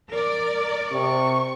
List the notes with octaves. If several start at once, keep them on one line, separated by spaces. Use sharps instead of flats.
A#4 D5
C3 C#6